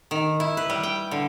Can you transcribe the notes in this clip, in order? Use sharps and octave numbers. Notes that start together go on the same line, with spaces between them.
D#3
E4
B4
G3
G5
D3